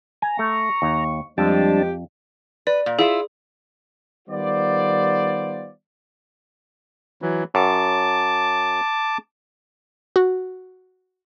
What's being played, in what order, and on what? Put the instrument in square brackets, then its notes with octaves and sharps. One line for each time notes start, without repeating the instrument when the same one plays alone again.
[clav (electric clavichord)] G#5 [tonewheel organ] A#5
[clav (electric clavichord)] A3 [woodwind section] C#6
[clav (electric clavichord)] D#2
[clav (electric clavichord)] F2 [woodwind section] F3 G#3 [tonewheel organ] G3 D4 A5 [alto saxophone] G4
[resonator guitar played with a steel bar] B4 [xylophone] D5
[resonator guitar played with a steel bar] A#2
[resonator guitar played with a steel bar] E4 F4 E5 [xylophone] G#4
[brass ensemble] D#3 G3 B3 F4 C5 D5
[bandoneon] E3 F#3
[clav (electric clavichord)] F#2 [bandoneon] A5 D6
[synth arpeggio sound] F#4